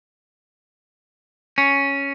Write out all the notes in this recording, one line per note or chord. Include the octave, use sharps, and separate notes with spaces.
C#4